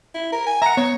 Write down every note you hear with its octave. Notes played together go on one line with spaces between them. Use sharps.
E4
A#4
G#5
E5 F#5 A#5
B3 C#5